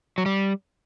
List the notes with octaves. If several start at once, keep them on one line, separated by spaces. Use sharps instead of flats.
F#3
G3